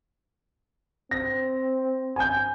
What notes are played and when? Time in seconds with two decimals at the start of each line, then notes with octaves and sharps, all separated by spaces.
1.11 C4 A#6
2.16 G#5 G6